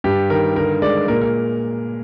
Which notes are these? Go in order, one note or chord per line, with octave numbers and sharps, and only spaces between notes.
G2 G4
D#3 A#4
D3 A#4
G#3 D5
A#2 A#4
A#4